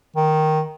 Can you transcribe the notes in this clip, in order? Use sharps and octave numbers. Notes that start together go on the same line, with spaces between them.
D#3